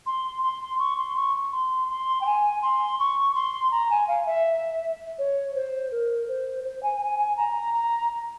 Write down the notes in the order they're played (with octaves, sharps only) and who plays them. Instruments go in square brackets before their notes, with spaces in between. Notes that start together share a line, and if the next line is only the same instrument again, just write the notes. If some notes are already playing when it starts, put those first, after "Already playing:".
[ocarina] C6
C6
C#6
C6
C#6
C6
C6
G5
G#5
C6
C#6
C6
A#5
G#5
F5
E5
C#5
C5
A#4
C5
C5
G#5
G#5
G#5
A#5
A#5